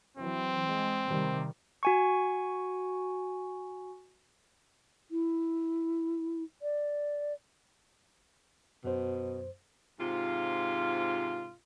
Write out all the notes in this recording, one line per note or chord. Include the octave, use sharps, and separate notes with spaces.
E3 F#3 C4
G#3
C3 D#3 G3
F#4 G#5 C#6
E4
D5
F#2 B2 C5
G#2 C3 F4